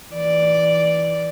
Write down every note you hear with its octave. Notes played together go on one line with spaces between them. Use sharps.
E3 D5